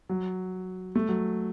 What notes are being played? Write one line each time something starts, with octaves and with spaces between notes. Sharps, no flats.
F#3
A3
F#3